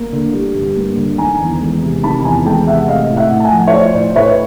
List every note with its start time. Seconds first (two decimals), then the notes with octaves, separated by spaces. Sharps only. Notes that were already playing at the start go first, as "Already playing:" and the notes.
Already playing: A#3
0.12 D3
0.34 G3
0.55 G2
0.76 A#3
0.97 D3
1.18 D#3 G#5 A#5
1.40 E2
1.61 G#3
1.82 C3
2.03 D#3 A5 B5
2.25 E2 G#5 A#5
2.45 G#3 G5 A5
2.67 C3 E5 F#5
2.88 A3 D#5 F5
3.10 A2
3.16 E5 F#5
3.31 A2
3.40 A5
3.45 F#5 G#5
3.52 F3
3.67 C#5
3.73 A3 C5 D5
3.94 A2 C5 D5
4.16 A2 B4 C#5